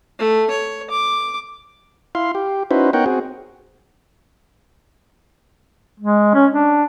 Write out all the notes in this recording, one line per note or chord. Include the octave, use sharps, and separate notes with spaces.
A3
C#5
D6
E4 F5 C6
G4
C#4 D#4 E4 F#4 B4 C5
B3 D#4 A#4 C#5 F#5 G5
C4 F#4 G#4
G#3
C#4
D4